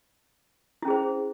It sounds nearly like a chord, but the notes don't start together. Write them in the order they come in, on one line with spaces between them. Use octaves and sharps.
E4 C#4 G#4 C5